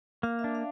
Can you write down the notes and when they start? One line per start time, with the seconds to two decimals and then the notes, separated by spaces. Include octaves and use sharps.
0.23 A#3 F5
0.39 E5
0.44 D4
0.55 F5